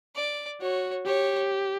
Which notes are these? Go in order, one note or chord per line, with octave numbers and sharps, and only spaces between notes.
D5
F#4 C#5
G4 C#5